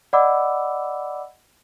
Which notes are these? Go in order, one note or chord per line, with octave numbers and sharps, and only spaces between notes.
D5 D#5 F#5 B5 D6 E6